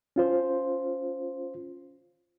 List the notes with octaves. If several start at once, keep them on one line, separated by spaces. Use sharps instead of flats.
C#4 F4 C5